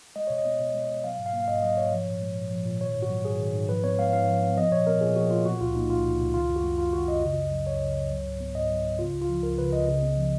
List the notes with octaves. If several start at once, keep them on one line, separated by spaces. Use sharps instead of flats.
G#3 D#5
B2 C#5
D#5
B3
B2
G#3
B2
F#3 F5
G#2
F5
A#3
F5
G#2 D#5
F#3 D#5
G#2 C#5
F3
A#2
G#3
A#2
F3
A#2
D#3 C#5
G#2
F#4
F#3
G#2 G#4
D#3
G#2
F3 B4
B3 C#5
G#3 F5
G#2 F5
F3
B3
F3 D#5
A#2 C#5
B3 A#4
A#2 G#4
F3 F#4
A#2 F4
B2 F#4
C#2 F4
A#3 D#4
C#2 F4
B2
C#2
D#3 F4
F#2
F#4
G#3
F#2 F4
D#3 F#4
F#2 D#5
C#3
C#2
F#3
C#2 C#5
C#3
C#2
F#3
G#2
B3
G#2 D#5
F#3
G#2
C#3 F4
C#2
F4
F3
C#2 A#4
C#3 B4
C#2 D#5
C#3
B3
F3